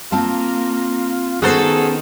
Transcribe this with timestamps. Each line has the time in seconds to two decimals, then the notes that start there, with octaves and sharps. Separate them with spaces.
0.12 A#3 C4 F4 F5 A5
1.42 D#3 B3 C#4 F#4 G#4 A4 C5